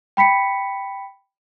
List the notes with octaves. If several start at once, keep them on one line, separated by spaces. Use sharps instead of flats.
G5 B5 B6 C#7